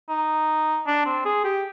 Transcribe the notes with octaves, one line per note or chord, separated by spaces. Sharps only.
D#4
D4
C4
G#4
G4